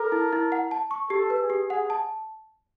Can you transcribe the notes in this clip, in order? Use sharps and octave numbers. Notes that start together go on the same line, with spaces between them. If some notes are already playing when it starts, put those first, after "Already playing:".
Already playing: A4 A#4
E4
E4
F#5
A5
C#6
G4 A4
B4
G#4
G4
G#4 F#5
A5